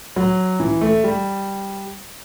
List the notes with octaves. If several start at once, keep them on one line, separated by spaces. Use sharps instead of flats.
F#3
E3
A3
G3